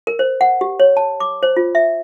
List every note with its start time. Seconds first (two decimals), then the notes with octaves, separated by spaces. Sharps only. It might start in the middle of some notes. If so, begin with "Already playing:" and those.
0.07 A#4
0.19 C5
0.41 F#5
0.61 G4
0.80 C#5
0.97 A5
1.20 D6
1.43 C5
1.57 F4
1.75 E5